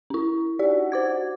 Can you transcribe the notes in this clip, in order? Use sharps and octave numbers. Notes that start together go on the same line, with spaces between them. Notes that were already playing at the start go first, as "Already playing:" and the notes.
C#4 E4
D4 D#4 F#4 G4 D5
C5 D6 G#6